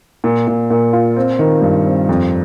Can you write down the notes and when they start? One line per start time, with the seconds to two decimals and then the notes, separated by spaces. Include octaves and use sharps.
0.24 A#2
0.47 A#2
0.70 A#2
0.93 F4
1.17 C4
1.39 D#3
1.62 G2
1.86 C4
2.09 F2